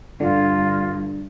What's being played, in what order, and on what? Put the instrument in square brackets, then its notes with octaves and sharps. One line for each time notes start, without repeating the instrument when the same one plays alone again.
[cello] G2 [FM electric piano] D3 [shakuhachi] F4